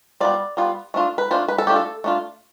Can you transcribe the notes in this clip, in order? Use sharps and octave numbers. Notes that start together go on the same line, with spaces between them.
G3 B3 F4 D5
G3 B3 F4
A3 D4 F4
B4
A3 D4 F4 C5
B4
A4
A3 D4 F4 G4
A4
A3 D4 F4